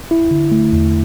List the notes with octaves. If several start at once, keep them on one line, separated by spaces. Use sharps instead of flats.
E4
D3
A3
E2